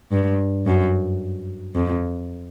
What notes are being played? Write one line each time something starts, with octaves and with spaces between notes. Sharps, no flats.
G2
F#2
F2